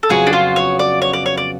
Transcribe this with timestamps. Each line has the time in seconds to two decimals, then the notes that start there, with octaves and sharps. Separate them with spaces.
0.03 A4
0.09 F2 C#3 F#3 B3 F#4 G#4
0.27 D4
0.33 F4
0.56 C#5
0.79 D5
1.02 C#5
1.13 D5
1.26 C#5
1.37 D5